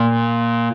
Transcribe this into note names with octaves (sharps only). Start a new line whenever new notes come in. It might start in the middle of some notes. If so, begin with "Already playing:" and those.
Already playing: A#2